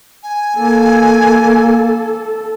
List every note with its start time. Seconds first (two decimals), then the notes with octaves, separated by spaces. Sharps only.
0.23 G#5
0.56 A#3 A4